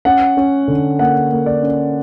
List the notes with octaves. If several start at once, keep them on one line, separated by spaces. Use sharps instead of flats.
C#4 F#5
C#4
D3
A#3 F#5
A#3
D5
C#4